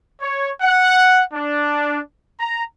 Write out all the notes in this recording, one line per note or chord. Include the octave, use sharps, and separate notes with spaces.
C#5
F#5
D4
A#5